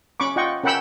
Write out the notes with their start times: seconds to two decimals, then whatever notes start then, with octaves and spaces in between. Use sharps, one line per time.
0.20 C#4 B5 C#6 D6
0.36 F4 D#5 F#5 G5 C#6
0.63 C#4 A#4 F#5 G5 B5 E6